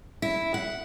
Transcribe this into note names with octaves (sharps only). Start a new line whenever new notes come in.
E4
F#5